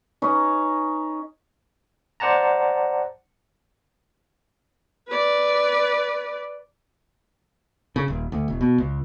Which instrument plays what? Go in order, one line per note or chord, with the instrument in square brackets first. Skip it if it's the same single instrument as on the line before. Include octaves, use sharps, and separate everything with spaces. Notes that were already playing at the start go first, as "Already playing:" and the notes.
[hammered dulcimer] C#4 D#4 B4 D#5
[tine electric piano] C5 D5 F#5 A5 A#5
[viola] B4 D5
[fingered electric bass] C#3
D#1
D2
E1
B2
C#2